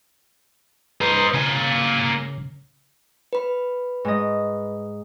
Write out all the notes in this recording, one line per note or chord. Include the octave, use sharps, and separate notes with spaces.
B4 C5 D#5 A#5
C#3 A#3 G#5
B4 B5
G#2 D#5